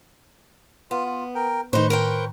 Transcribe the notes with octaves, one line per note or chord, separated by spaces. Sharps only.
B3 F4
F4
A#4 G5
A2 D#3 D#4 B4 C5 C#6
A#4 C5 G5